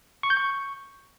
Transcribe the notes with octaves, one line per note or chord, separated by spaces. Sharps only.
C#6
G6
C#6